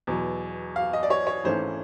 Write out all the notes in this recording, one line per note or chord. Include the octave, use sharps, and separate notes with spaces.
E2 B2 F#3
F5
D#5
D5
C#5
C#5
G#1 G#2 E3 A3 C#4 C5